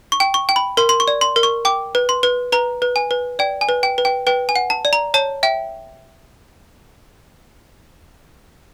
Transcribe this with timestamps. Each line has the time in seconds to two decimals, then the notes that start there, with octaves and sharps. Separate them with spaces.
0.12 C#6
0.20 G5
0.34 C#6
0.49 G5
0.56 B5
0.77 A#4 C6
0.89 C6
1.00 C#6
1.08 D5
1.21 C6
1.36 A#4
1.43 C#6
1.65 G5 D6
1.95 B4
2.09 C6
2.23 B4
2.52 B4 A#5
2.82 B4
2.96 G#5
3.11 B4
3.39 D5 G5
3.61 G#5
3.69 B4
3.83 G5
3.98 B4
4.05 G5
4.27 B4 G5
4.49 G#5
4.56 F#5
4.70 A5
4.85 D5
4.93 A#5
5.14 C#5 A5
5.43 E5 G5